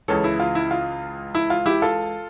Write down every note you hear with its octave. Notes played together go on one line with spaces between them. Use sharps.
C#2 C#3 E3 A4 C#5
E4
F4
E4
F4
E4
F4
E4 G4
F4 A4